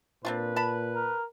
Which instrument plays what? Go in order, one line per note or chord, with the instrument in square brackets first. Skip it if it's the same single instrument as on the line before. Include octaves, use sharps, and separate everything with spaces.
[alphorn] A#2 [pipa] C4 D4 F4 [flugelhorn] B4
[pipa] A5 B5
[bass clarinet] A#4